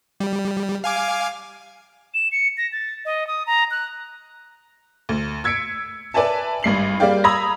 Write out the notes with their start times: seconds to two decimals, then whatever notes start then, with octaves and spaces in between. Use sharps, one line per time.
0.20 G3
0.84 F5 G#5 D6
2.14 E7
2.32 C#7
2.57 A#6
2.72 A6
3.05 D#5
3.27 D#6
3.47 A#5
3.71 F#6
5.09 D2
5.44 E6 G#6 B6 C#7 D7
6.14 B4 D5 E5 G#5 A5
6.63 G#1 G2 C7 F#7
7.00 G3 A#3 G#4 D5 F5 G5
7.24 A#5 B5 D#6 E6 G#6 A#6